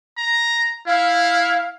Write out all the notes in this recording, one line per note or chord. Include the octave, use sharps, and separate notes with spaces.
A#5
E4 F5